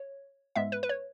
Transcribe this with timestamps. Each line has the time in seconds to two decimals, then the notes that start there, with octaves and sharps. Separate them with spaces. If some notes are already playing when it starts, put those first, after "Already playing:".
Already playing: C#5
0.56 G#2 G#3 B3 E5
0.72 B4
0.83 B4
0.89 C#5